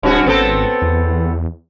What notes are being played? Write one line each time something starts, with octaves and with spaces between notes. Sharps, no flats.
D1 G2 C#4 F#4
G#1 B3 C4 A4
E2